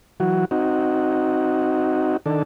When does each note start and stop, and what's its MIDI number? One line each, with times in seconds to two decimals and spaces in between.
0.20 0.45 52
0.20 0.45 54
0.20 0.45 66
0.51 2.17 60
0.51 2.17 63
0.51 2.17 66
2.26 2.43 51
2.26 2.43 62
2.26 2.43 69